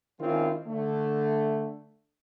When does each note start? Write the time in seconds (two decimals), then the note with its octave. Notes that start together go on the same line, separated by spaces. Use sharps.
0.20 D#3 G#3 C4 C#4 E4 F4
0.66 D3 A3